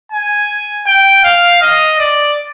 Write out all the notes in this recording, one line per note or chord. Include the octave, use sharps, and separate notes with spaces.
G#5
G5
F5
D#5
D5